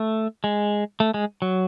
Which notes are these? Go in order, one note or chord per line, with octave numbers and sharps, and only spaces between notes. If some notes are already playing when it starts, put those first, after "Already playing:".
Already playing: A3
G#3
A3
G#3
F#3